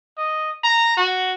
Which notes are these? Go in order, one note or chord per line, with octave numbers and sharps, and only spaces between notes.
D#5
A#5
F#4